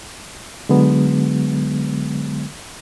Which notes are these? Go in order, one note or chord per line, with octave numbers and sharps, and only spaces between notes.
D3 F#3 G#3 B3